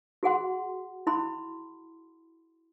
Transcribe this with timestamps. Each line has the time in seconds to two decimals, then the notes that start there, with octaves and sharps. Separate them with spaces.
0.23 F#4 G#4 F#5 C6
1.07 E4 B5 C6